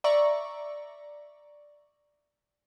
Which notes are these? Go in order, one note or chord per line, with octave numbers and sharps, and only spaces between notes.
D5 E5 A#5 C#6